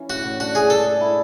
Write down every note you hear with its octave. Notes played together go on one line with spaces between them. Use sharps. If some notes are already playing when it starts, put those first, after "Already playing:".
Already playing: E3 C#4
A2 F#4
A2
D4 F#4
A3 G#4
A3 A4
A4
E4